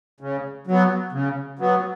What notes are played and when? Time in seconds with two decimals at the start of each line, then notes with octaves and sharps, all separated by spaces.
0.21 C#3
0.67 F#3 B3
1.13 C#3
1.59 F#3 B3